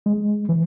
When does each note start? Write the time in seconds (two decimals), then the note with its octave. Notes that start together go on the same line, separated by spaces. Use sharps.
0.06 G#3
0.49 E3